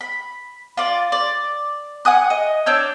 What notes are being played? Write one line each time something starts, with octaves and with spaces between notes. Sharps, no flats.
B5
F4 D5
D5
F#5 G#5 D#6 F#6
D#5
D4 C#5 E6 G6